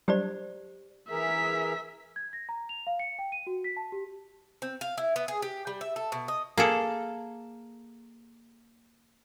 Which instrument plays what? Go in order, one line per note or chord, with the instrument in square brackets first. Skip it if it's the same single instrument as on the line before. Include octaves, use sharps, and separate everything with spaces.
[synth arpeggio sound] F#3 G3 D4 [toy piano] G4 C5 D5
[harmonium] E3 G#4 A#4 [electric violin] E5 B6
[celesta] G#6
A#6
A#5
F7
F5
C#7
G5
D#7
F#4
B6
A5
G4
[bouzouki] C4
F5
E4
B3
G#4
G4
G3
E5
A4
B2
D#5
[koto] A#3 G#4 A4